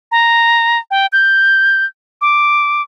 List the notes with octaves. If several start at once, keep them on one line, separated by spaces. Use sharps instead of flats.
A#5
G5
G6
D6